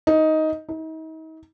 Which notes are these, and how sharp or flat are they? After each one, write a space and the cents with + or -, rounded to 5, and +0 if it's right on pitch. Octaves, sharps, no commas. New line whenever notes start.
D#4 +10
D#4 +40